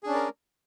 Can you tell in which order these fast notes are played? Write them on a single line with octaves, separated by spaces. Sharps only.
G#4 D4 C#4 D5 A#4